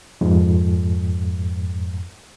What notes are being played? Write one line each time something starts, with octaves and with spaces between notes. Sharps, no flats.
F2 G#2